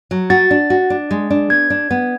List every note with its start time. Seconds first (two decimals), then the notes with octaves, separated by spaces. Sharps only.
0.11 F#3
0.30 F#4 A6
0.51 D4
0.70 F#4
0.90 D4
1.11 G#3
1.31 D4
1.50 B3 G#6
1.70 D4
1.91 B3